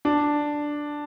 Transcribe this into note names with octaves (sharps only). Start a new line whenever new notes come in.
D4